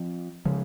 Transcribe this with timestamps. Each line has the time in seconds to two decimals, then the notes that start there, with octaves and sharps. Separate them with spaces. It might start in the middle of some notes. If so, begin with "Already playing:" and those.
Already playing: F3 C4
0.46 C#3 F3 G#3